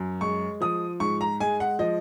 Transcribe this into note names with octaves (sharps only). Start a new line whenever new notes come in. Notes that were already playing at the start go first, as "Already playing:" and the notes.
Already playing: F#2
G#3 C#6
F3 D#6
G#2 C#6
A#5
G#3 G#5
F#5
F3 D#5